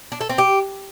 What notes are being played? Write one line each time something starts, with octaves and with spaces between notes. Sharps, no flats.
D4
A4
C4
G4